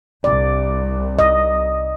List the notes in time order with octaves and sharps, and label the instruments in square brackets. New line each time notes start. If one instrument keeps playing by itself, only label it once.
[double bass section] C2 [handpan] D5
[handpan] D#5